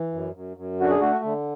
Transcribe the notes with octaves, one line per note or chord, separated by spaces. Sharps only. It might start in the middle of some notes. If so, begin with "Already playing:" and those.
Already playing: E3
F#2
F#2
F#2
D3 F#4
G#4
A3 F#4
D3